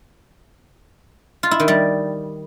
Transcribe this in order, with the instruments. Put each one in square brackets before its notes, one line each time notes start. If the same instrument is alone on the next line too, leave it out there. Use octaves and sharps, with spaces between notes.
[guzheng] F4
E4
D#3
G3